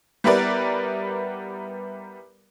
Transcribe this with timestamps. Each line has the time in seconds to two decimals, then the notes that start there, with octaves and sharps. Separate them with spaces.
0.24 G3 B3 E4 A#4 B4 D5